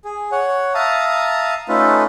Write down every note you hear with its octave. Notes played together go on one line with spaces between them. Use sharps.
G#4
C#5 F#5
E5 F5 A5 A#5 D#6
A3 C#4 D#4 F4 A4 B4